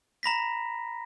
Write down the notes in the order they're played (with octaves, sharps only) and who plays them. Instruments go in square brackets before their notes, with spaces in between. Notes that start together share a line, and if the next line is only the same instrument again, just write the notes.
[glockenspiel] A#5 B5 A#6 B6